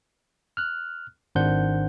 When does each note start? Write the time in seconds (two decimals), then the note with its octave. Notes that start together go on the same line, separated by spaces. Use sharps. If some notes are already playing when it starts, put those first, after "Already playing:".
0.57 F6 F#6
1.35 G#1 D#3 D4 C5 F#5 G6